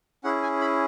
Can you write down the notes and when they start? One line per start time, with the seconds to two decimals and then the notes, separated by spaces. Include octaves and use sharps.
0.24 C#4 E4 G#4 F#5
0.43 G#5
0.61 B5